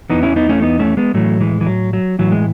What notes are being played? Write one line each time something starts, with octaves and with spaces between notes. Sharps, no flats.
E2 C#3 E3 B3 D#4
C#4 E4
B3 D#4
A3 C#4
B3 D#4
A3 C#4
G#3 B3
A2 E3 F#3 A3
E3 G#3
E3
F#3
F#3
A2 E3 F#3
G#3